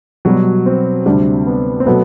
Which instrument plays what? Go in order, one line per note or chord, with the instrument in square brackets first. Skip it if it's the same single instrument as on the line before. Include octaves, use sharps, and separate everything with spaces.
[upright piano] B2 G3 B3 [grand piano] F#3
[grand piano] C4
[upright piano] D2 C3 G3 D4
[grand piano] B3
C4
[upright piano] B2 F#3 A3 [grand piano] B3